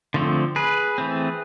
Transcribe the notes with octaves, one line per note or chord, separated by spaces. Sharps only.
D3 F3 A3 C4
G#4 B4
E3 A3 C4